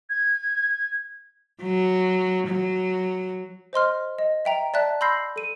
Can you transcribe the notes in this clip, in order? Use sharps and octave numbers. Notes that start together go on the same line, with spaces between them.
G#6
F#3
F#3
C5 D#5 C6 F6
D#5
E5 G5 A#5
D5 E5 A5 F#6
B5 C6 E6 G6 A#6 C7
A4 D#7